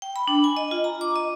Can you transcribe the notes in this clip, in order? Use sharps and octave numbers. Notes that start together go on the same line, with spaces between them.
G5
B5
D4
G#5
D#5
F4
A#5
D6
D#5